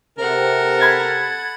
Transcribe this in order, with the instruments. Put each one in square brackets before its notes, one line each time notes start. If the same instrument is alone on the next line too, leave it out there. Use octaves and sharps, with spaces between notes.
[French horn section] C3 [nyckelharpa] A4 F#5 [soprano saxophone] A#4
[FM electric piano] B5 G#6 A6